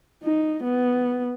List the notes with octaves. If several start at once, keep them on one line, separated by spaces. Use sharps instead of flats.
D#4
B3